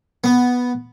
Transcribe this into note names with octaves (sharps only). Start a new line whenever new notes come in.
B3